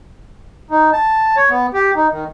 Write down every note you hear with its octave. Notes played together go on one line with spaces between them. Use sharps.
D#4
A5
C#5
B3
G4
D#4
D#3